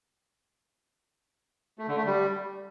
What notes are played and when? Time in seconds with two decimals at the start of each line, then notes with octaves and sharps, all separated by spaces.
1.79 A3
1.88 D3
1.97 A3
2.07 G3